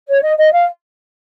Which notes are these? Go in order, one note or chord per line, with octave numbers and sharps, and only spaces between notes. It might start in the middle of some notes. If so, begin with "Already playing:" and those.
C#5
D#5
D#5
F5